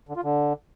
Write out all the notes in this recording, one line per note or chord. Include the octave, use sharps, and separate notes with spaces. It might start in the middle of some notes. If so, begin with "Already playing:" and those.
D3
F4
D3